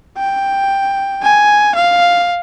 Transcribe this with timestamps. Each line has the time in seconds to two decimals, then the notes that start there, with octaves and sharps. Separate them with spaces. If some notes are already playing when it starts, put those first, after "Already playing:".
0.18 G5
1.23 G#5
1.75 F5